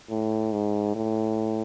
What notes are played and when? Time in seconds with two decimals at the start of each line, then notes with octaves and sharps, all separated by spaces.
0.10 A2
0.52 G#2
0.96 A2